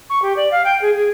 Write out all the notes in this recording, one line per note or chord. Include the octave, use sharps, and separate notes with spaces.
C#6
G4
D5
F5
G5
G#4
G#4